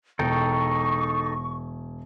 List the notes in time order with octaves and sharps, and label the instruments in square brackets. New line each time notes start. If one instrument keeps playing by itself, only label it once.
[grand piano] E1 [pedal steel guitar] D#4 A4 G5 [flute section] C#6